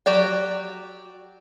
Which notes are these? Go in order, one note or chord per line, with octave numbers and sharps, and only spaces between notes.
F#3 F#4 G4 D5 G5